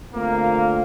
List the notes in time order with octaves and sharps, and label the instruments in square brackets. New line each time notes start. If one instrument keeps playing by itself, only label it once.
[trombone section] D3 A3 C4 F4 [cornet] A#3